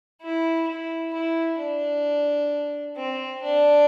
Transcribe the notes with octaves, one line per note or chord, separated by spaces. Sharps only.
E4
E4
E4
D4
C4
D4